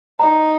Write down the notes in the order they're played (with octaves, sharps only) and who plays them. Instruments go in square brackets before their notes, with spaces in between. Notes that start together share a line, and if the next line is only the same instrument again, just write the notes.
[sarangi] D#4 [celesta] A#5